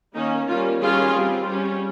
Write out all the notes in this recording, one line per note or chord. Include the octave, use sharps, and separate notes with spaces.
D#3 A#3 C#4 D#4
G3 A#3 C#4 F4
D#3 G3 C#4 F4 G#4
G3 C4
G3 C#4